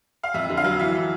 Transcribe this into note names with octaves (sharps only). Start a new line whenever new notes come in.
F5
F2 E5
D3
F5
F#3
E3 E5
E3